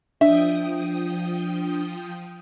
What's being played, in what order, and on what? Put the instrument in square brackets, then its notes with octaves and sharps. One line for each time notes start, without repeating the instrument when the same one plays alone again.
[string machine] F3 G5 D#6 [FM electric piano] D4 [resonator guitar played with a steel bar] E5